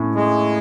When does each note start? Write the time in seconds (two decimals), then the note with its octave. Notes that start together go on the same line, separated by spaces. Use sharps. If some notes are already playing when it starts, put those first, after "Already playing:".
Already playing: A2 C#4
0.15 G#3